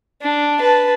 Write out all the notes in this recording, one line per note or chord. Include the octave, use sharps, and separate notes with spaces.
D4
B4 A5